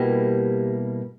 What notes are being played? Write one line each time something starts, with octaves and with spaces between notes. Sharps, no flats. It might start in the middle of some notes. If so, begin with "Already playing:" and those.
Already playing: B2 G3 A#3 E4 G4